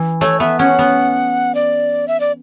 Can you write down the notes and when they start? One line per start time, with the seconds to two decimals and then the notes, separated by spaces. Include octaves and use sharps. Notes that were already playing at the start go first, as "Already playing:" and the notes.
Already playing: E3
0.21 A3 C#5
0.40 B3 E5
0.59 C#4 F#5
0.79 B3
1.55 D5
2.08 E5
2.20 D5